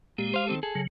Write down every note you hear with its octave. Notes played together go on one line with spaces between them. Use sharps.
A#2 G#3 G4
C5 F5
D#3 C4 A4
G#4 A4
C#3 F#3